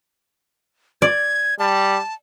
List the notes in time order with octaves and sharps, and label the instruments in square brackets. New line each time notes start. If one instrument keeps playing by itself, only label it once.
[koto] D5 [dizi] G#6
[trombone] G3 [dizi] A5